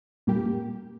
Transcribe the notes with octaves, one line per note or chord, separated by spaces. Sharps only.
A#2 G3 A#3 G4